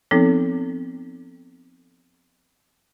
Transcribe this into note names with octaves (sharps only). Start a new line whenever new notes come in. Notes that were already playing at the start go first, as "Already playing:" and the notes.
F3 B3 C4 D#4 A4